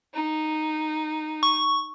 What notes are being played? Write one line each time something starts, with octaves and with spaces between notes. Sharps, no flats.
D#4
C#6